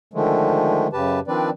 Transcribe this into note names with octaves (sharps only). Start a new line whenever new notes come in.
D3 D#3 F3 G#3 A3
F#2 C#3 G4 B4 A5
D#3 F3 C4 D4 B4 D5